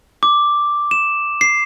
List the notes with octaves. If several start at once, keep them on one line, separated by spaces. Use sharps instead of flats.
D6
E7
C7